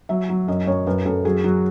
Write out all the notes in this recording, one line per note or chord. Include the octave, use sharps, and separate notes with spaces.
F#3 E5
F#3
F#2 D#5
F#2 C#5
F#2 B4
F#2 A4
F#3 G#4
F#3 F#4